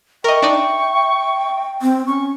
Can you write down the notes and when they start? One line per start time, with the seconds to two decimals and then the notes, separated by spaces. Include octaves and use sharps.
0.24 A#4 D#5 E5 G5 C#6
0.42 D4 D#4 D5
1.82 C4
2.07 C#4 C#6